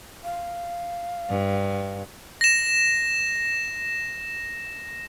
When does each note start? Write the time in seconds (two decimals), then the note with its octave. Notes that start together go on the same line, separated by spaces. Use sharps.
0.24 F5
1.30 G2
2.41 A#6 E7